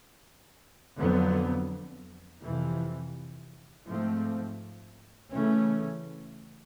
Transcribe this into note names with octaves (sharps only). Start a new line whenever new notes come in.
F2 D3 F#3 B3
F2 C3 E3
G#2 F3 A3 C4
C#3 E3 A3 C#4